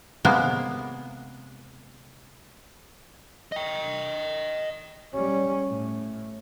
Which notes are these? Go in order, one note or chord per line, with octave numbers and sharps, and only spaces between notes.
C3 G#3 A#3 B3
D#5 G5
G3 C#4
A2